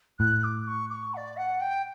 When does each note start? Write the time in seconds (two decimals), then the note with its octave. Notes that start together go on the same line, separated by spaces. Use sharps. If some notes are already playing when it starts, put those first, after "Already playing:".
0.19 A2 F#6
0.44 D6
0.67 C#6
0.90 D6
0.94 C#6
1.14 F#5
1.17 D5
1.37 F#5
1.61 G5